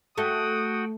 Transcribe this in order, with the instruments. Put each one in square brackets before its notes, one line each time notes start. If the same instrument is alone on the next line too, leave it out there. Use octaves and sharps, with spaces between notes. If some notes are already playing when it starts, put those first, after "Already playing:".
[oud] A3 [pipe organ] F#4 F#5 G5 [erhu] D#6